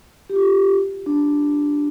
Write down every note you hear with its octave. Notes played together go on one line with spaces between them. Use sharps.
G4
F4
D4